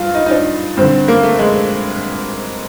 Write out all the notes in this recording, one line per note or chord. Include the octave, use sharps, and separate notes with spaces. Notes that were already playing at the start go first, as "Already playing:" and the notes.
Already playing: G2 F4
D#4
D#4
D4
G2 D3 C4
A#3
A3
G#3